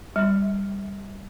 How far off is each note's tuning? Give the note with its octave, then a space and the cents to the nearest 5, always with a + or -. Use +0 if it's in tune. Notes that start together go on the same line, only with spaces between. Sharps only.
G3 +10